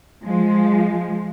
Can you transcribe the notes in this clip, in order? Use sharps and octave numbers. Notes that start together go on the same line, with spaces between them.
F3 G#3